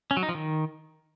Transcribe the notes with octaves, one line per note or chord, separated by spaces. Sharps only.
C#4
F#3
D#4
F3
D#3